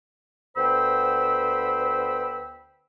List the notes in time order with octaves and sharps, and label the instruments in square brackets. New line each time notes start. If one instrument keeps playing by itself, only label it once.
[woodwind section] D2 B3 C5 G5 B5 E6